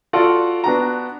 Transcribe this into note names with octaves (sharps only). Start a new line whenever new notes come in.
F4 F#4 A4 D5 F#5
B3 D4 F#4 A#5